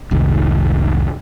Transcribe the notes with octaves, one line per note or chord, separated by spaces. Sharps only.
F1 C2 G#2 D#3